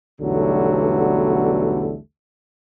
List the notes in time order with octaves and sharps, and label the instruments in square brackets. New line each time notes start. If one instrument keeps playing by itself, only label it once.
[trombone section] B1 E2 D3 F#3 G3 A3